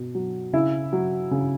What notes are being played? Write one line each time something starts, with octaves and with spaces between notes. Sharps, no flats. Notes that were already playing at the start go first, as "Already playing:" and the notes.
Already playing: B2
F#3
C#3 E4
F#3
C#3